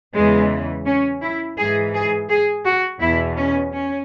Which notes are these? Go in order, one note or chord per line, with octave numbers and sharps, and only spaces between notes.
E2 C#3 E3 G#3
C#4
E4
G#2 E3 G#4
G#4
G#4
F#4
E2 B2 E4
C#4
C#4